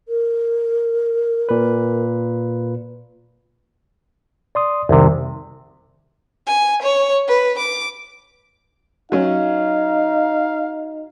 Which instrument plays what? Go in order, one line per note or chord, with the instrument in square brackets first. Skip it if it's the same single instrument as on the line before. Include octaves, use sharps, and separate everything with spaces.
[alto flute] A#4
[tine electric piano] A#2 B4
D5 C6 D#6
[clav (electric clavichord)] C2 C3 [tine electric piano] F2 D#3 G3
[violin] G#5
C#5
B4
D6
[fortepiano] F#3 C#4 [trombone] D#4 [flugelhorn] F5